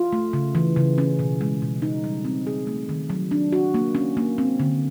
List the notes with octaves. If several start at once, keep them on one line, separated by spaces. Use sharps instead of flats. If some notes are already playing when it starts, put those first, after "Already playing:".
Already playing: F4
A3
C#3
E3
C#3
C#4
B2
G#3
B2
D#4
G3
C4
G#4
A3
D#3
F#3
D4
F#4
A#3
C#4
A#3
C4
D3